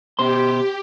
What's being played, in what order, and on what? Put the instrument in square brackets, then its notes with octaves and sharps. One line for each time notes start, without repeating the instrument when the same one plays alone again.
[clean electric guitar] B2 C5 C6 [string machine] G4